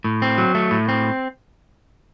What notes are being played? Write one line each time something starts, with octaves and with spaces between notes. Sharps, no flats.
A2
C4
F#3
A3
A2
C4